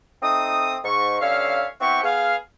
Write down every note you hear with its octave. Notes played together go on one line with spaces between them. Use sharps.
A3 C4 D#4 D#6
G#2 C#6
G2 D3 C#4 C#5 E5 F5
B3 C4 E4 G4 F#5 C#6
B3 G#4 F5